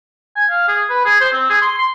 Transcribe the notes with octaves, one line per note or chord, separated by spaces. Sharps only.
G#5
F5
G#4
B4
G#4
C5
C4
G#4
C6
C6